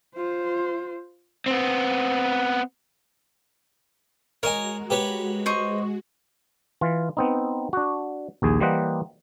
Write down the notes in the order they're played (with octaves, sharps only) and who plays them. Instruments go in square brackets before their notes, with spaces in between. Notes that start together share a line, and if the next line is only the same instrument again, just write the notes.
[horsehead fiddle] F4 C5
[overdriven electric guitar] B3 C4
[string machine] G#3 F#4 [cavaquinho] A#4 [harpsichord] C#5 D#5 G#5
[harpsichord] G4 B4 C#5
[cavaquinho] C5 D#5 C#6
[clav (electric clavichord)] E3 F4
B3 C4 D#4
D4 F#4
A#1 D#2 G#4
E3 G3 A#3 C5 D#5 F#5